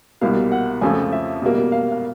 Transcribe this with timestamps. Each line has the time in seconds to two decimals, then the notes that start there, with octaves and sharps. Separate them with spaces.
0.21 C2 B2 G3 A#3 F5
0.52 F#5
0.81 F2 C#3 F3 A3 G#5
1.12 E5
1.42 B2 G3 A#3
1.72 F5
1.92 F5